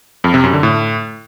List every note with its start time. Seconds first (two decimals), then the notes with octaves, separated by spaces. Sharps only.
0.24 F2
0.34 C3
0.44 F#2
0.53 D3
0.63 A2